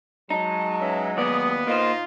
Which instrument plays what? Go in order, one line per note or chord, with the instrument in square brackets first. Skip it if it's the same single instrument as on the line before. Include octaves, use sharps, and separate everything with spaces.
[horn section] F#3 G#3 [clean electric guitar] D#4 [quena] A5
[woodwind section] C#4 B4 E5
[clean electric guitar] D#2 D5 [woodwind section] B3 [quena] D#6
[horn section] A#2 D#4 F4 [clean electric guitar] A#3 C5 [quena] D#5